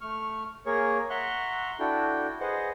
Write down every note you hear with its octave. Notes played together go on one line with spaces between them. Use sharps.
A3 C#6 F6
A#3 G#4 A#4 C#5 C#6
E5 F#5 A#5 C6 C#6 F#6
D4 E4 F#4 A4 G5
G#4 B4 C5 D#5 F#5